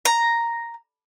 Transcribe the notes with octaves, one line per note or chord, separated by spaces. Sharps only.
A#5